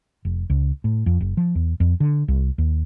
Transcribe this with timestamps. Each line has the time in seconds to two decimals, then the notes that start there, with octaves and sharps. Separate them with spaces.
0.25 F1
0.50 C#2
0.84 A2
1.06 F2
1.20 F#1
1.37 F3
1.55 E2
1.80 F2
2.00 D3
2.28 C2
2.58 D#2